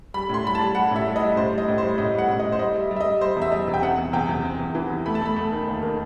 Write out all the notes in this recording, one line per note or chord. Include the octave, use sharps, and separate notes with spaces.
G3 B5
A2 C6
G3 B5
A5
G3
G3 F#5
A2 E5
G3
D#5
G3
A2 C5
G3
D#5
A2
G3 C5
A2 D#5
G3 F#5
A2
A2 D#5
C5
G3 D#5
G3
E5
G3
E5
D#5
G3
G3 C5
E2
E5
G3 D#5
E2
G5
C3 F#5
E2
E2 G5
E2
C3
E2
E3
E2
A3 B5
A5
A3 B5
A3
D#3
D#2
D#3